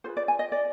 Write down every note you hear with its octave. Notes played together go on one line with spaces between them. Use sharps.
F4 G#4 B4 C5
D5
G#5
D#5
D5